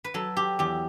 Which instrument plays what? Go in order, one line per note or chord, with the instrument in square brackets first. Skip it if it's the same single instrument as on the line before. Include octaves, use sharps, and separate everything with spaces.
[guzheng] B4
F#3 A4
G4
E2 G4